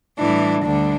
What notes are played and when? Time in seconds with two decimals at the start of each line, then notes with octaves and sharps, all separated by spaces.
0.19 A2 E3 G3 D4
0.64 D2 D3 G3 D4